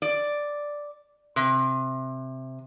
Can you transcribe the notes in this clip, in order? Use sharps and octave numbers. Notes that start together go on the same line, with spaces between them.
D5
C3